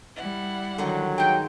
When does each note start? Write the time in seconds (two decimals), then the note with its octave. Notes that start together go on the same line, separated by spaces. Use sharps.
0.16 G3 E4 F#5
0.78 D3 D#3 F#3 D#4
1.18 G#3 D#4 G5